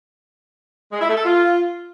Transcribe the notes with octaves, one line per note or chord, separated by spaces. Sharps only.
G#3
E4
A3
A4
F4